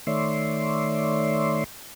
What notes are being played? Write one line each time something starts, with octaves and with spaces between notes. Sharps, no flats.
D#3 A3 C#5 D5 E5 C6